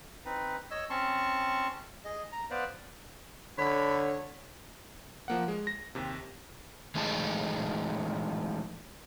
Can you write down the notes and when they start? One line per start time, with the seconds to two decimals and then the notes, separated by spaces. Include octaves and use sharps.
0.25 C4 D#4 B4
0.71 C#5 D#5 E6
0.90 C4 C#4 A5 C6 C#6
2.05 G#4 D#5
2.32 A#5
2.51 B3 B4 C5 D5 F5
3.58 D3 C#5 B5
5.28 F3 A#3 F#5
5.48 G#3
5.67 A#6
5.95 D#2 C3
6.95 E3 G#3 A3 D#4 G#4 A5